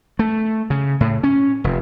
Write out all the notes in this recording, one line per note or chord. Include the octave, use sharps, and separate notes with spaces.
A3
C#3
A2
C#4
F1